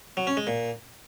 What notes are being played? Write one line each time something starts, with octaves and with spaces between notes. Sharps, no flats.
F#3
C#4
G#3
A#2